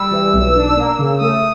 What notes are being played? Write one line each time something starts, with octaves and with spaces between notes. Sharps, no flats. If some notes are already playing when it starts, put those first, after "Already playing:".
Already playing: G3 E6
E3
B1
D4
A#3
C#3
A3 D#6